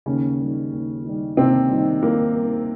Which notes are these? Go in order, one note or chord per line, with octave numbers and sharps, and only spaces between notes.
D#2 C#3 C#4
D#3 G3
D#2
D#3 G3
D#2 C3 C4
D#3 G3
D#2 A#3
D#3 G3